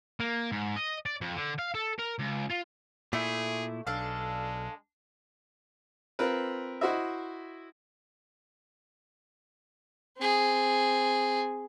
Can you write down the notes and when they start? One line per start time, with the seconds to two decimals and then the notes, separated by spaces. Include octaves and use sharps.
0.20 A#3
0.52 G#2
0.76 D#5
1.06 D5
1.21 F2
1.36 D3
1.59 F5
1.75 A4
1.99 A#4
2.19 C#2
2.50 F4
3.13 A#2 A3 E4 G#4
3.87 B1 G#3 D4 A4 F5
6.19 C4 F4 A#4 B4
6.81 E4 F#4 C5 D#5 E5
10.18 C4 G#4